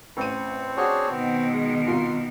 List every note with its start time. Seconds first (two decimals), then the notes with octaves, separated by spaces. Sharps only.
0.17 A1 C4 D#7
0.77 D4 F#4 G#4 C#5
1.10 B2 D#3 B3
1.52 G#3
1.87 C2 F4 A#4 C6